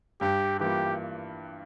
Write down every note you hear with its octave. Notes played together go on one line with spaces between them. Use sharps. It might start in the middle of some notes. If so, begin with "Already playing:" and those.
G2 G4
E3 G3 A#3 F4 G4